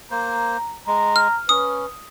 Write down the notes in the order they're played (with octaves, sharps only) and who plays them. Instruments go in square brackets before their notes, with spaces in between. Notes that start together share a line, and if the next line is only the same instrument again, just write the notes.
[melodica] A#3 C5 [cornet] A#5
[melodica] G#3 [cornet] A#5
[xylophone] F6
[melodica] C#4 [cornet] B4 [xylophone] D#6